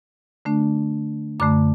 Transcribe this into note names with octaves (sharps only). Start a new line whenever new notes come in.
D3 A3 D4
F#2 D3 A3 D6